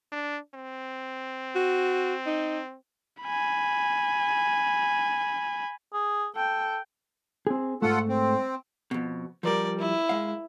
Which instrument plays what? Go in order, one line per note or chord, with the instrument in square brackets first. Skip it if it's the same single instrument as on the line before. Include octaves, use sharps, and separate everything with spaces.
[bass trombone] D4
C4
[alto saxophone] F#4
D#4
[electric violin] G#5 B5
[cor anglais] G#4
[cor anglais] A4 [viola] G5
[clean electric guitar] C4 G#4
[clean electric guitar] G#2 A3 [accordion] F4 A4 F#5
[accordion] C4
[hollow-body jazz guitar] F2 B2
[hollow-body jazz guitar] F3 G3 [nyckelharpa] A#4 D5
[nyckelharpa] E4
[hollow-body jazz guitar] G#3 F5